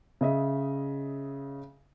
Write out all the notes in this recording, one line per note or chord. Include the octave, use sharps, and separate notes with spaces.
C#3 D#5 E5